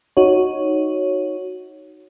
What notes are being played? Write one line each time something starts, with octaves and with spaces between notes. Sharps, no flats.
D#4 F#4 C#5